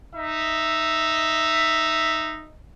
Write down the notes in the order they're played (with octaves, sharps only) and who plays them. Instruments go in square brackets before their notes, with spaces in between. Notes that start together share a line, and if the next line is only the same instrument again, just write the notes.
[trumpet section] D#4 E5